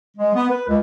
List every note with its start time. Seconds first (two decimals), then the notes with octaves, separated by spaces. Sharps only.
0.17 G#3
0.35 B3
0.50 B4
0.68 C#2